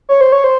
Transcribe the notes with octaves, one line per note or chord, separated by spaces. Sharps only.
C#5
C5
C#5
C5